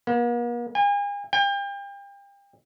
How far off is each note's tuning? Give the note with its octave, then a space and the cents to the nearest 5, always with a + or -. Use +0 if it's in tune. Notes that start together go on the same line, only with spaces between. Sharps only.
A#3 +45
G#5 -40
G5 +35